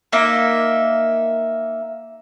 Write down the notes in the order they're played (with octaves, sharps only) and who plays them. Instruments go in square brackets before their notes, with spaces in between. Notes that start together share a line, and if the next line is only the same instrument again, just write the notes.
[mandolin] A#3 D#4 E5